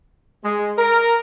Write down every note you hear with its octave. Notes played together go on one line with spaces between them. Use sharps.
G#3
A#4